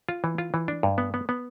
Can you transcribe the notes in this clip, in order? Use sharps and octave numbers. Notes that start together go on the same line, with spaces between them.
F4
E3
F4
E3
D4
G2
B3
B3
B3